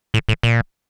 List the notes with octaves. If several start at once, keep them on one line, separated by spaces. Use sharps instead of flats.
A2
A2
A#2